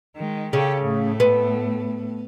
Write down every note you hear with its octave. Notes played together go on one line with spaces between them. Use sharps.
D#3 G#3
C#3 G4 A4
A2 A3
B3